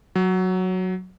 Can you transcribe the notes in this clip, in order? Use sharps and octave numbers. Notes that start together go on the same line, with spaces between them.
F#3